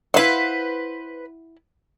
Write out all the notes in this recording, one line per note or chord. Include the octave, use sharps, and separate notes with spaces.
E4 B4 C5 F5 F#5